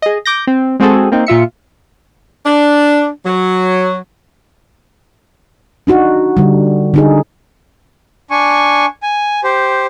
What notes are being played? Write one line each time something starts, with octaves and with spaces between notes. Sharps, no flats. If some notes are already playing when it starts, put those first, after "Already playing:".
G#4 D#5
D6 G6 A#6
C4
G#3 C4 F#4 G#4 A4
A#3 C4 D#4
A#2 F4 E5 C#7
D4
F#3
D4 D#4 F#4
D3 G3
D3 D#4 G#4
D4 G#5 C#6
G#5
G4 C5